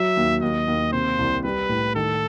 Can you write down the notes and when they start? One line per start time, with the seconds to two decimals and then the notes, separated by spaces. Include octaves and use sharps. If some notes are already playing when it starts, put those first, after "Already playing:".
Already playing: F#3 E5
0.17 D#2
0.42 D#2 D#5
0.68 D#2
0.92 C3 C5
1.19 C2
1.44 G3 B4
1.69 A2
1.95 D#3 A4